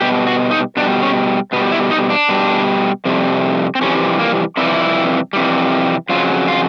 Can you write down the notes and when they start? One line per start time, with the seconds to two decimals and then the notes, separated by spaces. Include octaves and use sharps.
0.01 B2 G3 G4
0.27 F#4
0.51 D#4
0.77 B2 D4
0.81 G3
1.03 C#4
1.53 B2 B3
1.56 G3
1.72 E4
1.91 D#4
2.10 D4
2.29 B2 G3
3.05 F2 C3 G3
3.75 C4
3.81 F2 C3 E3 G3 C#4
4.19 A#3
4.57 F2 C3 E3 G3 E4
5.33 F2 C3 E3 G3
6.09 F2 C#3 F#3 F4
6.48 F4